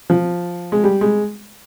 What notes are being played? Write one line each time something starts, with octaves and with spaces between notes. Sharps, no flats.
F3
G#3
G3
G#3